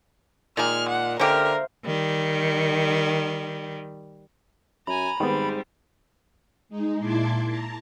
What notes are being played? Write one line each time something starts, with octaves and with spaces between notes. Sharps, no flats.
A#2 D#3 G#3 A#3 G#4 D#6 F6
F#5
D3 C#4 G4 A#4 C5 E5 F5
D#3 G3
F#2 G#5 A#5 B5
G#2 D#3 G3 B3 C4
G#3 D#4
A#2 E4 A5 C6 D6 G#6
A5 A#5